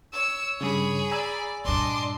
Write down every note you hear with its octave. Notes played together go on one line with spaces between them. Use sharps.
C#5 E6
G2 C#3 G#4 B5
D5 G#5 A#5 E6
G2 A#2 D4 D#5 C6 D6